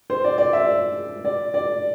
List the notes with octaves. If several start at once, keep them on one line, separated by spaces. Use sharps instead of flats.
C5
D5
D5
E5
D5
D5